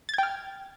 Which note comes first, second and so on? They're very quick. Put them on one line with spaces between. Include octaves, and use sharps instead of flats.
A6 G#6 G5 F6